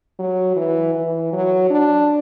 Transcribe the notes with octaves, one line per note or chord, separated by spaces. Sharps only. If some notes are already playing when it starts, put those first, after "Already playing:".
F#3
E3
E3
F#3
D4